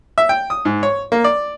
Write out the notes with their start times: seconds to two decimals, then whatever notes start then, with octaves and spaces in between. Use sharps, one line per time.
0.18 E5
0.29 G5
0.50 D#6
0.65 G#2
0.83 C#5
1.12 A#3
1.24 D5